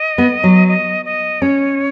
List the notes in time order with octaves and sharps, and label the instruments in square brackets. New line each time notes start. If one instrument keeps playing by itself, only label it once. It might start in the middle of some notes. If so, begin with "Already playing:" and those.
Already playing: [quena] D#5
[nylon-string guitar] B3
F#3
[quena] D#5
D#5
[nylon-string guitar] C#4 [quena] C#5